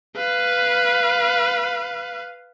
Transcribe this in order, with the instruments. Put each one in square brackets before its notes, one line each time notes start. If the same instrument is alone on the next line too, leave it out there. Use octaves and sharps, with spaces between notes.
[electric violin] B4 F5